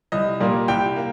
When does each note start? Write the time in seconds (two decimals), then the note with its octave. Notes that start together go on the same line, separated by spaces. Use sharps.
0.12 C2 D#5
0.40 A#2 G3 A#3
0.68 C2 G5
0.96 A#3